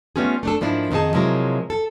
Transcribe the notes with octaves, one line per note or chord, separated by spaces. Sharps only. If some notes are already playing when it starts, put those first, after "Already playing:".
G3 A3 B3 C#4 F4 G#4
A3 D4 A4
G#2 F3 A#3 D4 E4
F2 D#3 B3 D#4 G#4 A5
C3 F3 F#3 G#3 E4 A#4
A4